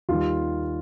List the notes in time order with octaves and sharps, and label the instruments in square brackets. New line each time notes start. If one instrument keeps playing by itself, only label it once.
[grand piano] D#2 D#3 G3 F4